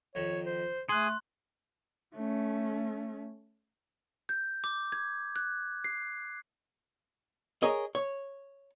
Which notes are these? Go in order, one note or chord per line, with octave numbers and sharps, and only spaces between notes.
F2 D#3 C#5
C5
A3 G#4 C6 D6 F#6
A3 C#4
G6
D6
G#6
F#6
C7
G#4 A#4 C#5 D#5
C#5